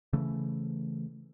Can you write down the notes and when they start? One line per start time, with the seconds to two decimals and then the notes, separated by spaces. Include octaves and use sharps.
0.13 C#3 E3 A3